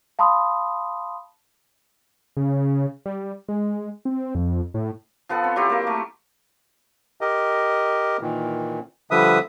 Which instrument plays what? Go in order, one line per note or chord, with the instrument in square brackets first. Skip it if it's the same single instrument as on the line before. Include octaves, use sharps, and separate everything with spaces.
[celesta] F5 A5 B5 C6 D#6
[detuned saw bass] C#3
G3
G#3
C4
F2
A2
[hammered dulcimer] F3 B3 A4 F#5
C4
F#3 E4 G4 C5
A#3 A#4
A3
[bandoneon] G4 A#4 D#5
A#2 D#3 E3
D3 F3 G3 B4 E5 D#6